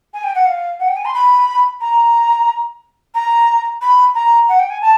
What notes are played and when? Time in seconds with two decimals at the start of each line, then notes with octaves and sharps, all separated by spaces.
0.13 G#5
0.23 G5
0.35 F#5
0.46 F5
0.79 F#5
0.88 G5
0.96 G#5
1.05 C6
1.14 B5
1.81 A#5
3.14 A#5
3.81 B5
4.14 A#5
4.48 F#5
4.59 G5
4.70 G#5
4.81 A5